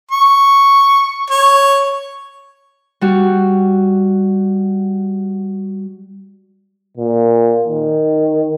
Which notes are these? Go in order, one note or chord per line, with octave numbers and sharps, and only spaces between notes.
C#6
C#5
G3 F#4
A#2
D#3